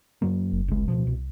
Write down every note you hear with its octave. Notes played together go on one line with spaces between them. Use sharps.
F#2 F#3 A#3
F#1
C2 G#3
D1 G#1 B2 F3
C2